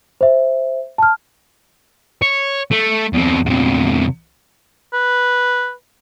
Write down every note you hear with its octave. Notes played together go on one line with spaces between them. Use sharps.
C5 E5
A5 F6
C#5
A3
E2 C4
E2 C3
B4